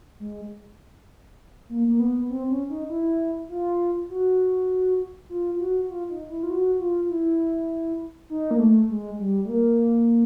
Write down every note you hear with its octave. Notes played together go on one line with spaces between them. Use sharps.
G#3
A#3
A#3
B3
C4
C#4
D#4
E4
F4
F#4
F4
F#4
F4
D#4
E4
F4
F#4
F4
E4
D#4
A#3
A3
G#3
G3
A3
A#3